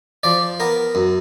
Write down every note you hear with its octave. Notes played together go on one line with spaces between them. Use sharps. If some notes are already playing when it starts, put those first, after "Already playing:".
F3 D5
B3 A#4
F#2